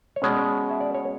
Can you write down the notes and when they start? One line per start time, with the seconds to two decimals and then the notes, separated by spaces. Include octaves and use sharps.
0.16 C#5
0.22 B2 G#3 C#4 D5
0.71 E5
0.81 D5
0.95 C#5